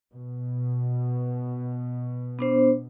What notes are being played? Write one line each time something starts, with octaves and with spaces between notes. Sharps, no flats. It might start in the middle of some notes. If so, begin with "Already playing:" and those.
B2
B3 D4 C5